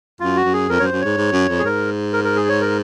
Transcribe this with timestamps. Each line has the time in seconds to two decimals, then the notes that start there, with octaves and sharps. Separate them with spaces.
0.20 F#2 F4
0.36 F#4
0.45 F#2
0.53 G#4
0.69 F2 A#4
0.79 F#2 C#5
0.84 C5
0.92 F#2
1.01 G#2 C#5
1.17 G#2
1.32 F#2
1.49 F2
1.59 G#4
1.64 G#2 A#4
2.13 A#4
2.24 A#4
2.36 G#4
2.48 C#5
2.61 A#4